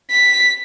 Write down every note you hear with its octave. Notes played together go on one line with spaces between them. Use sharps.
B6